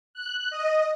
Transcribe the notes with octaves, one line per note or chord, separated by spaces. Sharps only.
F#6
D#5